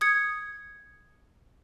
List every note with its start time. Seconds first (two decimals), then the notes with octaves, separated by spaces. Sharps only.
0.01 D#6 G#6 C#7